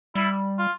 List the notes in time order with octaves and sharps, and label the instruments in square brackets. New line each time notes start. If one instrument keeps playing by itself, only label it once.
[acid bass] G3 [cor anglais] E4
[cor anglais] F4